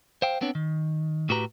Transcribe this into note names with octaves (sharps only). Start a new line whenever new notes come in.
C5 F5 G5
B3 C4 D4 C#5
D#3
A2 F#4 G4 B4 A#5